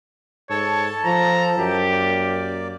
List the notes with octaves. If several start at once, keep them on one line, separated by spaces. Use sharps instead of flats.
G#2 A4 C#5 A5
F3 A#5
F#2 G4
A#3 D5